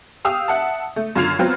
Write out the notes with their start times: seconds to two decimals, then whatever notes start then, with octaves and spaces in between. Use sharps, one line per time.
0.25 G4 F5 D#6 E6
0.48 E5 F#5 A5
0.96 A3
1.16 F#2 D3 F4 G#6 C7 F7
1.39 F#3 B3 C4 F4